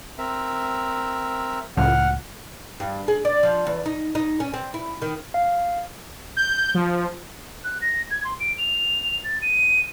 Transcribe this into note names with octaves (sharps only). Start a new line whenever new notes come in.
C4 A#4 E5
C#2 A2 F3 F#5 F6
G2
G#4
D5
F3
E2
D#4
D#4
C#4
C4
E4
D#3
F5
G6
F3
F#6
A#6
G#6
C6
D7
F7
A6
D#7